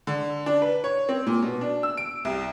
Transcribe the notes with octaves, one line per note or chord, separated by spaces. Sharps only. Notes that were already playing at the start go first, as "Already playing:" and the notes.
D3
D4
B4
C#5
C4
A#2
B2
D4
E6
D7
C2